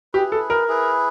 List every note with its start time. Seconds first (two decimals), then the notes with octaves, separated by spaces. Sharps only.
0.14 E4 G4 G#4 B4
0.32 A4
0.50 A#4
0.68 E4 G#4 B4